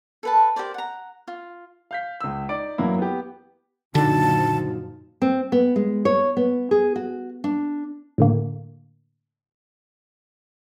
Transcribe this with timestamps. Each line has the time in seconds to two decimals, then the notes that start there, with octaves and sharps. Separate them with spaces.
0.23 A4 B4 A5
0.56 G4 A#4 C5 D5
0.74 F#5 A#5
1.28 F4
1.91 F5 G6 B6
2.21 C#2 E6
2.49 D#4 D5 D6 D7
2.78 F#2 E3 F#3 A#3 E4
2.98 B3 G4
3.95 F#1 A#2 D3 F3 D#4 F#4 A5
5.22 C4
5.52 B3
5.76 G#3
6.05 C#5
6.37 B3
6.71 G#4
6.96 F#4
7.44 D4
8.18 A2 D3 A#3